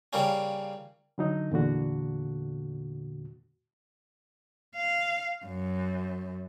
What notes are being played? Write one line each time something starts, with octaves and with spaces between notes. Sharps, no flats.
C#3 G3 A#3 C#4
D3 F#3 D#4
E2 A#2 D3 F#4
F5
F#2